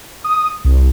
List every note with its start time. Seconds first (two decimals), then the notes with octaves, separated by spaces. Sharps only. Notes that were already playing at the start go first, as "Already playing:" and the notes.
0.24 D#6
0.65 C2